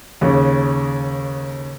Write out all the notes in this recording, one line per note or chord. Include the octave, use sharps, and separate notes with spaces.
D#2 C#3